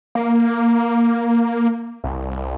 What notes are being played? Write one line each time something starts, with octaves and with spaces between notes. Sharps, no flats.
A#3
C2